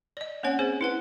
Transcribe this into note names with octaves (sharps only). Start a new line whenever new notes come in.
D5 D#5
A#3 C4 C#4 C#5 F#5
C4 G#4 C5
E4 B4 F#5